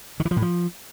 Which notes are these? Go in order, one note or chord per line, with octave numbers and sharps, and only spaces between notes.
D#3
E3
F3
A2
F3